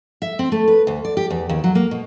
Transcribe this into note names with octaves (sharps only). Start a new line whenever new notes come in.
E5
C4
A3
B4
D2
D5
G4
E2
D#2
F#3
A#3
B2